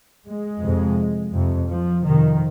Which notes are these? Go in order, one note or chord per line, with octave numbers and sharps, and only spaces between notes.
G#3
F2 C3
F2 C3
F3
F2 C3 D#3